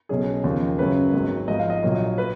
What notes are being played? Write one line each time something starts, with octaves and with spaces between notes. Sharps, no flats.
B1 B2 F#3 C#4 G#4
D#2 C#3 F3
F#2 C#3 F#3 B4
G#1 G#2 F#3
G#2 F3 G#3 B3 D#5
F5
D#5
A#1 A#2 F#3 A#3
B4